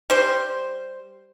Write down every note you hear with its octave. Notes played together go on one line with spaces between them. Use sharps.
G3 C5